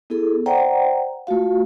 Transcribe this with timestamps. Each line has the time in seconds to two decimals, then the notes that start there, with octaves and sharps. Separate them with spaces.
0.10 B3 E4 G#4 A4
0.46 C5 D5 F#5 G5 A#5
1.27 A3 F4 F#4 F5